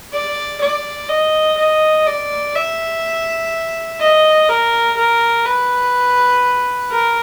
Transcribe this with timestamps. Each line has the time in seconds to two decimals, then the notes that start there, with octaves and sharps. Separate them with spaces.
0.12 D5
0.61 D5
1.09 D#5
1.58 D#5
2.07 D5
2.55 E5
4.00 D#5
4.49 A#4
4.97 A#4
5.45 B4
6.91 A#4